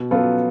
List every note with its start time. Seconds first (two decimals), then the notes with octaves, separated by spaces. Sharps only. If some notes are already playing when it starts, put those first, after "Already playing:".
Already playing: B2
0.11 F#3 B3 F4 A4